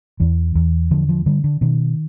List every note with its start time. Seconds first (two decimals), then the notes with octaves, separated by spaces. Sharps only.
0.20 E2 E3
0.55 E2
0.91 D3 F3
1.09 F3
1.26 D3 G3
1.44 D3
1.61 B2 D#3